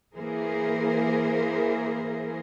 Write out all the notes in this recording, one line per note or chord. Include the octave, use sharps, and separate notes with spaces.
E3 A#3 G#4 A#4 C5